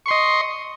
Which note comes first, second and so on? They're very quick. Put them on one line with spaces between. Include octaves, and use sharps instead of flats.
C#6 C6 D#5